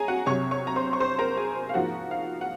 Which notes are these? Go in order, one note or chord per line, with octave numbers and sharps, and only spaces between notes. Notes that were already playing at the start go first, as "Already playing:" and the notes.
Already playing: G#4 C#5 G#5 A#5
F#4 F#5
C2 C3 F#3 C#5 C#6
C#5 C#6
A#5
C5 C6
C#6
C5 C6
A#4 A#5
G#4 G#5
F5
G#2 F3 A#3 F#4 F#5
F5
F#5